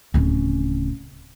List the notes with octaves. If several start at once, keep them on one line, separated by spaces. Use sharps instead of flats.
D1 C#3